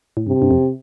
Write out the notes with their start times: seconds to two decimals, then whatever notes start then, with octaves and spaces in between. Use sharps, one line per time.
0.17 A2
0.27 G2 C3
0.42 G2
0.51 F2